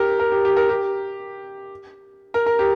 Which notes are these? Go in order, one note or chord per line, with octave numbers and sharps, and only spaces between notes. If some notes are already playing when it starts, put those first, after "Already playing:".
Already playing: G4 A#4
A#4
G4
G4
A#4
G4
A#4
A#4
G4